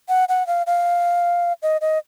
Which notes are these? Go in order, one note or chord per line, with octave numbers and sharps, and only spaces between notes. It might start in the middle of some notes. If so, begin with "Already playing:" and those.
F#5
F#5
F5
F5
D#5
D#5